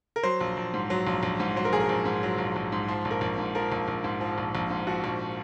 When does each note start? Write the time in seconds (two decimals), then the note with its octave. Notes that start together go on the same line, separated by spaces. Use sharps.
0.16 A#4
0.23 F#3 C5
0.41 A#1
0.57 A#1
0.74 G#2
0.90 F#3
1.07 A#1
1.23 A#1
1.40 G#2
1.56 F#3 C5
1.65 A#4
1.73 A#1 G#4
1.80 A#4
1.89 A#1
2.06 G#2
2.23 F#3
2.38 A#1
2.56 A#1
2.72 G#2
2.88 F3 C5
3.05 A#1
3.11 A#4
3.21 A#1
3.39 G#2
3.55 F3 A#4
3.72 A#1
3.88 A#1
4.04 G#2
4.21 F3
4.38 A#1
4.55 A#1
4.70 G#2
4.87 F3 F#4
5.04 A#1